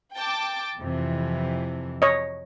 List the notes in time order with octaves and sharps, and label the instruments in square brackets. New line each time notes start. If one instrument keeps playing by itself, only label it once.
[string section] G5 A5 D6
F2 C3 E3
[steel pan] C#5 D#5